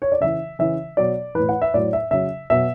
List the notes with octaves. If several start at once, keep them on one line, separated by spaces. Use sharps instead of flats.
C#5
D5
C#3 E3 E5
C#3 E3 E5
B2 F#3 D5
A2 E3 B4
F#5
E5
A2 F#3 D5
E5
C#3 F#3 E5
B2 F#3 E5